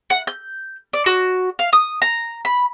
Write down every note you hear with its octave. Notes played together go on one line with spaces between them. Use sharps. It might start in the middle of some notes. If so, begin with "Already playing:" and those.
F#5
G6
D5
F#4
F5
D#6
A#5
B5